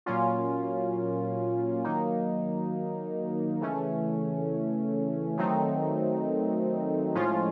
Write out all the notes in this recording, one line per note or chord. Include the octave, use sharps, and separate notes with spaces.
A#2 F#3 A#3 C#4 F4
D#3 F#3 A#3 D#4
C#3 E3 A3 C#4
D#3 F#3 A3 C4 D#4
A2 F3 G#3 C#4 F4